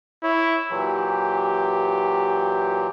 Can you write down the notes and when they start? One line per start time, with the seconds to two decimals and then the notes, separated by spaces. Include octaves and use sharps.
0.23 E4 C#5
0.70 A#2 E3 F#3 G4